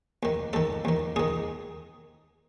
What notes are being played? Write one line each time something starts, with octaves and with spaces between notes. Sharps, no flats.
D#2 D#3
D#2 D#3 A4
D#2 D#3
D#2 D#3 G#4